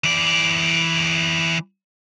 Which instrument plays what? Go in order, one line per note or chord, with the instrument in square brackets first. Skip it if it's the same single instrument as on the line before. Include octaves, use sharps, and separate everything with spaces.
[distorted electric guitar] E3 D5